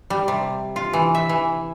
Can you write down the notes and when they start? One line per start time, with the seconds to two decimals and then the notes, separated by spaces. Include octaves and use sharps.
0.10 G3
0.28 C3
0.76 F4
0.93 E3
1.15 E5
1.29 E3